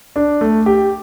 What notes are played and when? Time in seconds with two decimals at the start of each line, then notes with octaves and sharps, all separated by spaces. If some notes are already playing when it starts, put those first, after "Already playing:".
0.16 D4
0.41 A3
0.66 G4